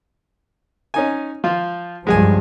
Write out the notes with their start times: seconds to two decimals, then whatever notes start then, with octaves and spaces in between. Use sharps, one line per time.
0.94 C#4 D#4 G#5
1.44 F3 F4
2.07 C#2 G2 F3 G#3 G#4 G#5